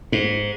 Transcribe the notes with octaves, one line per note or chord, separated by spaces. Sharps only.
G#2